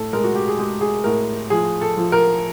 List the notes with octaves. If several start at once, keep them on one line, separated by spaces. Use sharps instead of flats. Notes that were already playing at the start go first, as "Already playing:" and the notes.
Already playing: A2 A4
G#3 A#4
F#4
G4
G#4
G#3 G4
G#4
A2 A#4
F3 G#4
A4
F3
A#4